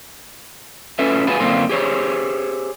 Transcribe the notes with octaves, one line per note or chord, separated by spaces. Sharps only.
C#4 F4 A4 B4 E5
F4 F#4 G#4 B4
F#2 D3 A#3 C4 F4
G4 G#4 C5 C#5